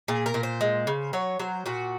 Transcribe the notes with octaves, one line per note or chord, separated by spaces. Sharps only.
A#2 G#4
A#4
A#2
C5
G#3
C#3
F#3 C#5
F#3 C5
A#2 F#4